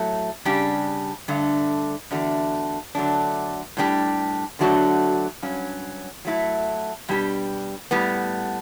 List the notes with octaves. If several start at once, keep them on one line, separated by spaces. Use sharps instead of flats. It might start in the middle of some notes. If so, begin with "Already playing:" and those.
Already playing: A2 F#3 A3
C#3 G3 D4 G4
G2 D3 A3
E2 D3 A3 D4 F#4
D3 F#3 A3 D4
A2 G3 D4 G4
D3 F#3 A3 D4 F#4
G2 F#3 C#4
F#3 A3 E4 A4
B2 G3 D4 G4
A2 G3 B3